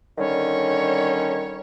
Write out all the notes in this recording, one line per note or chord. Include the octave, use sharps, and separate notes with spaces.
D3 D#3 G3 C#4 C#5